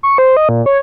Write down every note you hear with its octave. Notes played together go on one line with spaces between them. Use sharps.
C#6
C5
D#5
A#2
C#5